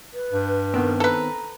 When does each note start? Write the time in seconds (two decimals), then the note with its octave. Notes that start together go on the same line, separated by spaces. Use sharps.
0.13 B4
0.33 G2
0.74 D#3 B3 C4 A#4
1.00 A4 B4 A#5